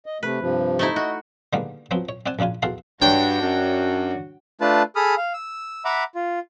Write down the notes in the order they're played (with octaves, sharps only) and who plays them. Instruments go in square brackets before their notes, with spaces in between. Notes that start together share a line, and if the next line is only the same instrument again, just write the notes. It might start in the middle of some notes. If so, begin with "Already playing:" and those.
[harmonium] D#5
[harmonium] C3 A3 [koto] B4
[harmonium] G2 C3 F3
[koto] A3 D#4 E4
[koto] F#4 [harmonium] D#5
[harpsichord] D3 D#3 G3 G#3 A#3 B3
F3 F#3 B3 C4
C#5
C4 D5 F#5 G#5 A5
A#1 C#3 D4 F4 G#5
E2 F#4 G#4 A4 F5 C6
[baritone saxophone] G2 [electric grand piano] D4 C#5 [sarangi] F#4 [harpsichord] G5
[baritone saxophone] F#2
[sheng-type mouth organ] A3 D4 F4 B4 A5
G#4 A4 B5 D#6 F6
F5
E6
E5 F#5 A#5 B5 D6
F4